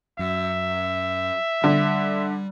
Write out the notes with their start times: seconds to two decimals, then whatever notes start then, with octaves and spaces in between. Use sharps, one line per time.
0.19 F#2 E5
1.64 D3 G3